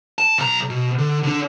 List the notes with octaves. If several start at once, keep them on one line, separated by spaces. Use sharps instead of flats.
A5
B1 A#5
B2
D3
D3 D4